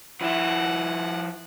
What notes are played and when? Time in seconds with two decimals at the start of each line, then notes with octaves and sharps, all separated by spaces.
0.21 F3 E4 F#5